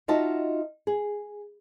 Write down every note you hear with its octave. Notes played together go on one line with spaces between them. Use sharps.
D#4 F4 F#4 D#5 E5 A5
G#4